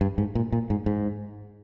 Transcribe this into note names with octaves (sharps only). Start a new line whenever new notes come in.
G2
G#2
A#2
A#2
G#2
G#2